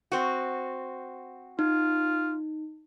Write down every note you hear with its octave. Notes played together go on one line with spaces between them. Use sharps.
C4 F#4
D#4 F4